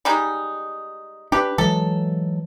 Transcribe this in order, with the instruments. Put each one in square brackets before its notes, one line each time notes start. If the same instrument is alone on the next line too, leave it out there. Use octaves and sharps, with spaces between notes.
[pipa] G3 G#3 D#4
[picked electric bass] D4 [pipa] G4 B4
[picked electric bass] E3 F#3 G#3 [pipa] A4